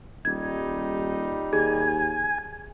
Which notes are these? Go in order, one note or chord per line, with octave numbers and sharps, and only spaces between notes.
D#1 G3 D#4 G#6
D#2 G#4 G#5